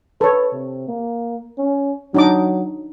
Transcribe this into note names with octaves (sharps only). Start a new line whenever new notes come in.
A4 B4 C#5
C3
A#3
C#4
F#3 D4 D#4 D6